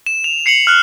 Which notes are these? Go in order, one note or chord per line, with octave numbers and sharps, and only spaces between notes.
E7
F7
C7 C#7 F7 F#7
F6 F#6